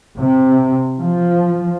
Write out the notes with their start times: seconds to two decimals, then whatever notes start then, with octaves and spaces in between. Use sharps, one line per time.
0.20 C3
1.00 F3